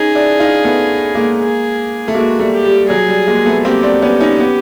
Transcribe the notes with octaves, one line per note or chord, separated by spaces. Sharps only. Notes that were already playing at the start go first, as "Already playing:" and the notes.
Already playing: C#4 D#4 G#4
D4 E4
D#4 F4
A3 B3
G#3 A#3
G#4
A3
G#3 A#3 F#4
G3 A3
G4
G3
G3
F#3 G#4
G3
G#3 A#3
A3 B3
A#3 C4 G4
C4 D4
B3 C#4
C#4 D#4
B3 C#4